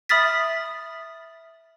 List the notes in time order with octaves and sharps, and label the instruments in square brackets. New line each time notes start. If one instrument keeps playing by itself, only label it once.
[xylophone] E5 B5 D#6 F6 A6 B6